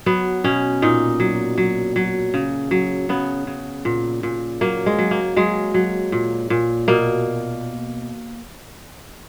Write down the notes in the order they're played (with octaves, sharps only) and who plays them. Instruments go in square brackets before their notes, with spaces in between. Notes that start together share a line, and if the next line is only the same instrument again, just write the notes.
[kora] F#3 B3
B2 C#4
A#2 D#4
F#3
F#3
F#3
C#3
F#3
C#3 B3
C#3
A#2
A#2
F#3 A#3
G#3
F#3
A#3
F#3 G#3
F#3
A#2
A#2
B2 A#3